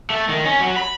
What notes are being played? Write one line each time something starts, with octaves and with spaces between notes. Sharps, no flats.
A3
D#3
C#4
F#3
B5